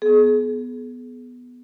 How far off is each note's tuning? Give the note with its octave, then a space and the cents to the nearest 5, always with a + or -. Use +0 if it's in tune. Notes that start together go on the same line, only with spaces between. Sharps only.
B3 +0 G#4 +35